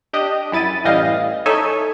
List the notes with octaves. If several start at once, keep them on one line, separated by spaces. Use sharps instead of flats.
D4 G4 D#5
F#2 E4 A6 D#7
A1 E3 G3 D#5 F5
D#4 A4 C#5 E5 G#5